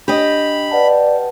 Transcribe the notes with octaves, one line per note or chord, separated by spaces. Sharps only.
D4 G4 D#5 B5
B4 D5 F#5 A5